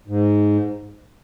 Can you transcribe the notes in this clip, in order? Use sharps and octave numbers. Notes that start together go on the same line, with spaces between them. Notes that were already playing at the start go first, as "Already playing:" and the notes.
G#2